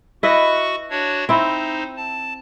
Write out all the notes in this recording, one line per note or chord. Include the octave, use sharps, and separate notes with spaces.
E4 F#4 B4 D#5 C#6
D4 F#4 C#5
C4 D#4 E4 C5
A5